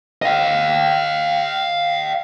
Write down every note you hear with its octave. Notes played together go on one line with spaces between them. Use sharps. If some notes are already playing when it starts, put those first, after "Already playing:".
D#5 F5